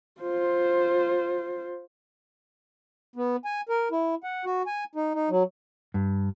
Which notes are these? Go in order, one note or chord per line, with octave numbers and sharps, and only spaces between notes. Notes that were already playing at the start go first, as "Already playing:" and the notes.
F4 C5
B3
G#5
A#4
E4
F#5
F#4
G#5
D#4
D#4
F#3
G2